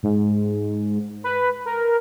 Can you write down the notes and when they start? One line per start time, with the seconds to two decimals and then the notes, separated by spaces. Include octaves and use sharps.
0.03 G#2
1.24 B4
1.66 A#4